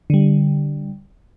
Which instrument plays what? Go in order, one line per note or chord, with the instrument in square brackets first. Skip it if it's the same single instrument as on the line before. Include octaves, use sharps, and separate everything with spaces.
[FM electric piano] D3 G3